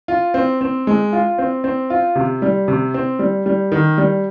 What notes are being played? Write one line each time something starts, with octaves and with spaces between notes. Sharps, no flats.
F4
C4
C4
G#3
F4
C4
C4
F4
C3
G3
C3
C4
G3
G3
D#3
G3